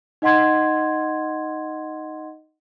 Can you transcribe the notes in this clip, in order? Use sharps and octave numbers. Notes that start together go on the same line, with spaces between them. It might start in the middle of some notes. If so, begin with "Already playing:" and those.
D#4 D#5 F#5 C6 G#6